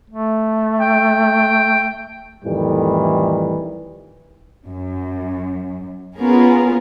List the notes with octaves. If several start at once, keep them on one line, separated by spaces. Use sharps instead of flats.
A3
G5
F2 A2 D#3 E3 G3
F#2
B3 C#4 F4 G#4 A#4 B4